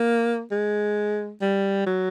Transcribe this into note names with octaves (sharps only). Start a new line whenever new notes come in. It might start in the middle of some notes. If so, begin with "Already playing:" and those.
Already playing: A#3
G#3
G3
F#3